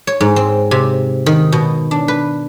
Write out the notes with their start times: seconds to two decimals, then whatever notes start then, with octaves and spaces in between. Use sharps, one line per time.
0.07 C#5
0.21 G#2
0.36 C4
0.71 C3
1.26 D#3
1.52 B2
1.91 D4
2.08 B4